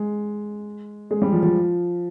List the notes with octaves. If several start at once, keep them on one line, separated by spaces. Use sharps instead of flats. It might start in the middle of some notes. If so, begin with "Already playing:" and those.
Already playing: G#3
G#3
G3
F3
F3